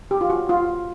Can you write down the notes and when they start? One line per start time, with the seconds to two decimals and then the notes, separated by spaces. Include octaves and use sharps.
0.11 G4
0.21 F4
0.30 F#4
0.49 F4